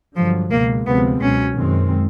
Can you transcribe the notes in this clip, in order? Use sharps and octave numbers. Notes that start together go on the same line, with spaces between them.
G2 D3 F3 F#3
C#2 B2 G#3 A#3
D2 C3 F3 G#3 B3 C4
C#2 B2 F#3 C#4
F#2 D#3 G#3 C4